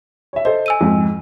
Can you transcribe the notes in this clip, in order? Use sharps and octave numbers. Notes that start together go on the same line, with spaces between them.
C#5 E5
A4 C5 D#5
G#5 E6 D#7
F2 G#2